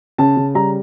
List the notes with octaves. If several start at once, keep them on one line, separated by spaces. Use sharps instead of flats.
C#3 A5
C#3
G3 A#5